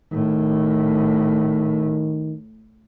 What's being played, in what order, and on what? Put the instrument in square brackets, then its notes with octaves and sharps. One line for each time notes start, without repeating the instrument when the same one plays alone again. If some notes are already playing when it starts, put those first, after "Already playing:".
[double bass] A2 [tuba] D#3